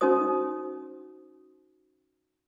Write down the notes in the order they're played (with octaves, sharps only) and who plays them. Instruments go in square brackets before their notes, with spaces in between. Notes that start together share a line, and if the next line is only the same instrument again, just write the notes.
[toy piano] C#4 D#4 F#4 C5 D#6